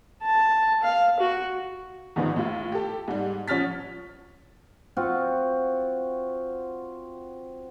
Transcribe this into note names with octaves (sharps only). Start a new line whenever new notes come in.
A5
F5
F#4
E2 G#2 D#3 F3 B3
A2 F4
G4 A4
G#2 G3
A1 F3 C#4 F6 A6 B6
C4 F4 F#4